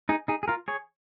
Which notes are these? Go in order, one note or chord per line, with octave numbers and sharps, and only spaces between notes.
D#4 G#4
D#4 G#4
G#4
F4 A#4
G#4 C#5